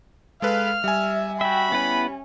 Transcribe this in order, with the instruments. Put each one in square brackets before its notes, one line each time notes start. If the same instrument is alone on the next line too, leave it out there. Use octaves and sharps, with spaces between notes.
[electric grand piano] G#3 A4 B4 [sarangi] F5 [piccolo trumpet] F6
[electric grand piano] G3 G#5 [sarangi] E5
[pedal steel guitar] F#4 E5 [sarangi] G5 [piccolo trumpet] B5
[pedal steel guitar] B3 E4 B4 [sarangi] C#4